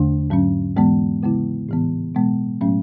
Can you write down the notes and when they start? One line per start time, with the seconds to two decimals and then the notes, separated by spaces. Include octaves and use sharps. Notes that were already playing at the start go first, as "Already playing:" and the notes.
Already playing: E2 D3 A3 D4
0.30 G#2 F#3 C#4
0.76 G#2 E3 G#3 B3
1.23 C#3 G#3 B3 E4
1.69 A2 E3 B3
2.15 B2 G#3 B3
2.61 A2 F#3 A3 C#4